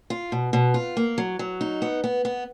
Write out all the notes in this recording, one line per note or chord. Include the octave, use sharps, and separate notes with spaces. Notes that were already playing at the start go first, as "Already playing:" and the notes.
F4
B2
B2
F4
A#3
F#3
F#3
D#4
B3
B3
B3